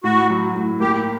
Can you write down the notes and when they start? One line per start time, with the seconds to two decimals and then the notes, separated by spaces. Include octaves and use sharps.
0.04 A2 F#4
0.30 F#3
0.55 A2
0.80 A#3 G4